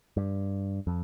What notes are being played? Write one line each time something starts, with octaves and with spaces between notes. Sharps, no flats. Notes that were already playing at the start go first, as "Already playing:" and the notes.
G2
F2